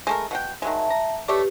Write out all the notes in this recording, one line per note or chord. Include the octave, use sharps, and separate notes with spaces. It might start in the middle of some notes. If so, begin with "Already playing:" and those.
G#3 A3 A#4
B2 F#5 G5
D#3 F#3 G#3 E5 A5
A#5
A3 G4 B4 C#5 D5